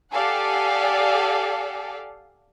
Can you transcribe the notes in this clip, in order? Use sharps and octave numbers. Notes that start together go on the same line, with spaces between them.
G4 A4 D5 F5 F#5 G#5